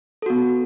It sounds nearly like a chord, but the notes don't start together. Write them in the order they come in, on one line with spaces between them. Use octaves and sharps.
A4 F#4 B3